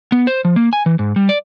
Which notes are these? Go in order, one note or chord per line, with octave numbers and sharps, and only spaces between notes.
B3
C5
F3
A#3
G#5
E3
G#2
G3
D5